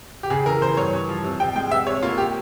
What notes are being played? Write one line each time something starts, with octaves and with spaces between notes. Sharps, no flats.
G4
C#3 G#4
E3 A#4
E3 C5
G2 C#5
G2
F3
C3
C3 G5
G#3 G5
C3 E5
C3 C#5
A#3 F4
C3 G4